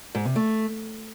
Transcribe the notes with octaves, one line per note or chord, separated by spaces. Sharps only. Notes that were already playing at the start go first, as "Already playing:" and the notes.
G#2
C3
A3